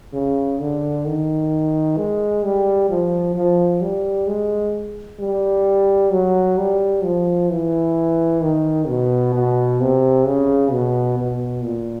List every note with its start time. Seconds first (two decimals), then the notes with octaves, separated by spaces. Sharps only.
0.13 C#3
0.59 D3
1.05 D#3
1.97 G#3
2.43 G3
2.89 F3
3.36 F3
3.81 G3
4.27 G#3
5.19 G3
6.12 F#3
6.58 G3
7.04 F3
7.50 E3
8.42 D#3
8.88 B2
9.34 B2
9.80 C3
10.26 C#3
10.72 B2
11.18 B2
11.64 A#2